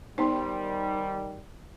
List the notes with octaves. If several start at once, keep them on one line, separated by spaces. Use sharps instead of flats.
D#3 G3 B3 D#4 C5 G5 C6